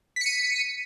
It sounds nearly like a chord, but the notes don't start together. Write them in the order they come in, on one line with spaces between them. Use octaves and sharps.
B6 C#7 D#7